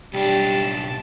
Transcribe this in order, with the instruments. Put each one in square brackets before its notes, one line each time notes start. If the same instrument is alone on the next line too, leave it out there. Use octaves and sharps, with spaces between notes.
[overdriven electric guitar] B1 D4 [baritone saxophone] G3 [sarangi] A5